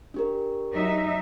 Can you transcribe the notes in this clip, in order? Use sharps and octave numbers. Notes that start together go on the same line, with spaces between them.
D4 G4 A#4
F#3 D#4 E5